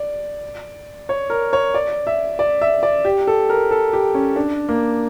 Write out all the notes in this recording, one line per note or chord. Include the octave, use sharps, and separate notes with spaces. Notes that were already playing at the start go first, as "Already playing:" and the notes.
Already playing: D5
C#5
A#4
C#5
D5
E5
D5
E5
D5
G4
A4
A#4
A4
G4
C#4
D4
A#3